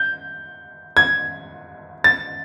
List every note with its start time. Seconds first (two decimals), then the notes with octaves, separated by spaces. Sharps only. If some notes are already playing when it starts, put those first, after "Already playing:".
Already playing: G6
0.97 G#6
2.04 A6